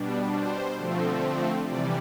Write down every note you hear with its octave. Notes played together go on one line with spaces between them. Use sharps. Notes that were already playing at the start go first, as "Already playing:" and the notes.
Already playing: B2 G3 D4
C5
D3 F3 A3 C4
C3 E3 G3 D5